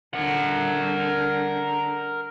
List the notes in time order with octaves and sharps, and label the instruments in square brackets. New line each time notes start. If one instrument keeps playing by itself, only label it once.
[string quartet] D3 [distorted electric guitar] A#4 F#5